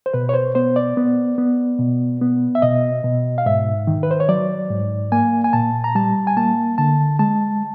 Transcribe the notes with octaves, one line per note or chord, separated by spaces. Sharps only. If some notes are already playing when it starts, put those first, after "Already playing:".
C5
B2 B4
C#5
C5
B3 C5
D5
B3
B3
B2
B3
E5
B2 D#5
B2
F5
G#2 E5
D#3
B4
C5
C#5
F#3 D5
G#2
A#3 G#5
G#5
A#2 A5
A#5
G3 A5
G#5
A#3 A5
D3 A5
G#3 A5